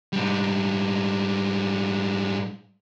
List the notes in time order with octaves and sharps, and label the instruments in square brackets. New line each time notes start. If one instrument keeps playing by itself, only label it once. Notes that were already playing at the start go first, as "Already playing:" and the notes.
[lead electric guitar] G#2 G3